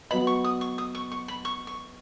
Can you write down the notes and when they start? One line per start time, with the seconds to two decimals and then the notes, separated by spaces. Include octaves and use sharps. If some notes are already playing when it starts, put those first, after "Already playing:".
0.10 F#3 B3 F#4 B4 D#5 B5
0.27 C#6
0.44 D#6
0.61 C#6
0.78 D#6
0.95 C#6
1.12 C#6
1.28 B5
1.45 C#6
1.67 C#6